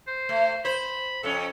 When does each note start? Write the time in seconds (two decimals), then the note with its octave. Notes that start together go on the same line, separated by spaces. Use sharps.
0.07 C5
0.29 A3
0.65 C5 B5
1.23 F2 C#4 A4